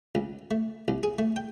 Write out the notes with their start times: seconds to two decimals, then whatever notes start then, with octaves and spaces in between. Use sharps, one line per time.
0.15 C#2
0.51 A3
0.88 C2
1.03 G#4
1.19 A3
1.36 G5